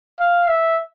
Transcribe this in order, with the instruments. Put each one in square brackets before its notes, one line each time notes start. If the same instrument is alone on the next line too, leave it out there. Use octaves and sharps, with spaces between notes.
[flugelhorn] F5
E5